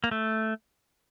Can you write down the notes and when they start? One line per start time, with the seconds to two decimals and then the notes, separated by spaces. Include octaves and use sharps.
0.04 A#3
0.11 A3